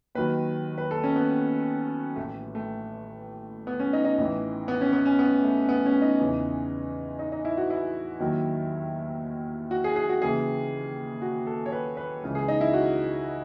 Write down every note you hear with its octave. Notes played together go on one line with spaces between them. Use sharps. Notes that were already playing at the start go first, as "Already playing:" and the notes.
D#2 D#3 F#3 B4
B4
A4
C#4
B3
A1 A2 E3 A3
A3
B3
C#4
D#4
D#4
A1 A2 E3
B3
C#4
B3
C#4
B3
A3
B3
C#4
D#4
E2 C#3 E3
D#4
D#4
E4
F#4
E4
D#2 D#3 F#3
F#4
G#4
G#4
F#4
D#2 C#3 E3 G#4
F#4
A4
C#5
B4
B4
C#2 C#3 E3
G#4
D#4
E4
F#4